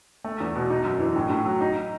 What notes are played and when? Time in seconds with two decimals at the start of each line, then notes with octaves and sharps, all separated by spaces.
0.24 A3
0.40 E2
0.55 B2
0.70 D#4
0.85 F#2
1.00 E3
1.16 A2
1.30 A2
1.46 F#3
1.61 D#4